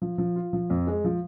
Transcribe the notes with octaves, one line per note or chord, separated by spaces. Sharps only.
F3
F3
F4
F3
F2
G#3
F3